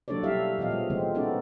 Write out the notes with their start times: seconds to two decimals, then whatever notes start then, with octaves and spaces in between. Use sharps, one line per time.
0.08 F#3 A#3 D4 A4 C#5 D5
0.23 B2 G3 E4 G4 E5 F5
0.58 A#2 F3 B3 D#5 F5
0.70 G#3
0.90 E3 F3 G#3 A3 C4
1.15 B3 C#4 D#4 F#4 A4 D5